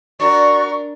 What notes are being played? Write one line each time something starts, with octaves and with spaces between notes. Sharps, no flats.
D4 F#4 A#4 D5 C#6